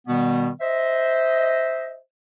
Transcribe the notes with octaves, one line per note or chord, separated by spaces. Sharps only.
B2 D#3 G3 B3
C5 D#5 E5